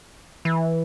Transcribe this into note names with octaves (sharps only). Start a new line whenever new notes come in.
E3